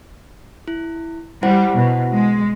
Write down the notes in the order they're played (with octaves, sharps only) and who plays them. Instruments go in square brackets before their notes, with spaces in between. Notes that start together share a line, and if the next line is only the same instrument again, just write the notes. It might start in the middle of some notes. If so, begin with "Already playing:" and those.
[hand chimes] E4
[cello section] G3 [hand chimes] E4 C5 F#5
[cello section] B2
G#3